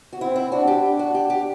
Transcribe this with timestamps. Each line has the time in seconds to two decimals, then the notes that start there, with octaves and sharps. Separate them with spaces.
0.13 F#4
0.20 C4 E4
0.36 E4
0.52 D4 F#4
0.67 G4
0.83 D4
0.99 F#4
1.14 G4
1.30 G4